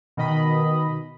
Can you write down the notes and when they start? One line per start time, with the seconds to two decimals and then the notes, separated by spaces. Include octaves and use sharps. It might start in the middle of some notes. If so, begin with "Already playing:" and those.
0.17 B2 D#3 D#5 B5